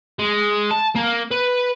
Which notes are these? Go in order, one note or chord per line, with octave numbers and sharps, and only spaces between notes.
G#3
A5
A#3
B4